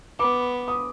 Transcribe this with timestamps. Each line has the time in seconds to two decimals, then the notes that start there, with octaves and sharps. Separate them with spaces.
0.19 B3 D6
0.68 D#6